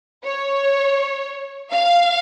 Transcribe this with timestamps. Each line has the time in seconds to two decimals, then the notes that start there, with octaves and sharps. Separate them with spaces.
0.24 C#5
1.71 F5